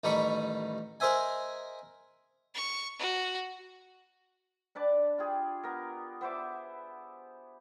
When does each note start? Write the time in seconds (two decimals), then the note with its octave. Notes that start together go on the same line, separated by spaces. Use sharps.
0.04 A1 D#3 G3 D#4 B5 C#6
1.00 G#4 A#4 C5 D#5 E5 G#5
2.54 C#6
2.99 F#4
4.75 D4 B4 D5 A5
5.18 F4 G4 G#4
5.63 B3 A#4
6.21 B3 C5 E5 D6